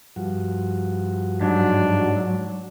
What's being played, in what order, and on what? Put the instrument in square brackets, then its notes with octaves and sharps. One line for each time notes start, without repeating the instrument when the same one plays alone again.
[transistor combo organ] G2 F3 F#4
[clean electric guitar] G#2 [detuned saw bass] F#3 [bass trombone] D4